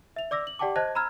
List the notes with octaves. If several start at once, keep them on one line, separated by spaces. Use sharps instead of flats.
E5 F7
D5 D6 E6 A#6
F#7
G4 D5 F#5 G5 A5 D6
C5 D#5 A5 F#6 G#6 A#6
A#5 B5 E6 F6 G#6